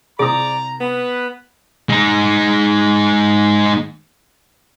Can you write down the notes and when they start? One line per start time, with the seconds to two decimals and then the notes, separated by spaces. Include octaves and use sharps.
0.19 C2 C4 G#4 D5 A#5 D#6
0.80 B3 B4
1.89 G#3 D#4